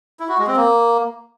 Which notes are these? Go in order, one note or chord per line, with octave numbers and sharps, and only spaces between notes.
E4
F#4
G#3
C4
A#3